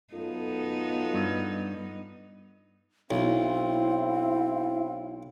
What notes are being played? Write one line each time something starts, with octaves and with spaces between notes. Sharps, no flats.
F#2 B3 D#4 F4 A4
G2
B1 C4 E4 F5